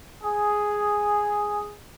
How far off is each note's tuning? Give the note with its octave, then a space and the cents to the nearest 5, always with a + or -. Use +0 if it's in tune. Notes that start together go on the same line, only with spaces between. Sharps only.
G#4 +0